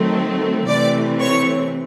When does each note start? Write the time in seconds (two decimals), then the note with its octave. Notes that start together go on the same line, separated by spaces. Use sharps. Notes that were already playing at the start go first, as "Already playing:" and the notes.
Already playing: D#3 F#3 A3 C4
0.67 C3 E3 A3 C4 D5 D6
1.21 C#5 C#6